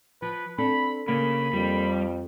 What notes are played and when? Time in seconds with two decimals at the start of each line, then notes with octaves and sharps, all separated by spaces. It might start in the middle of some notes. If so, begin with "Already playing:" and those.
0.22 F3 B4
0.58 C4 D4 A4 B5
1.08 C#3 A#3 B5
1.53 F2 G3